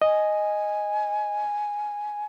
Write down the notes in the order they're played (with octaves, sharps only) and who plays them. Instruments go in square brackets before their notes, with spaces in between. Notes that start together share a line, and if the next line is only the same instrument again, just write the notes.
[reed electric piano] D#5 [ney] G#5